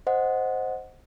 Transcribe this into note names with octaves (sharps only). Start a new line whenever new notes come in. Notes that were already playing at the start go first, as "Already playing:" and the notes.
C5 D#5 F#5